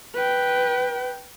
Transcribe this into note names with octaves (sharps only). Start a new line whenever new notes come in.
B4 G5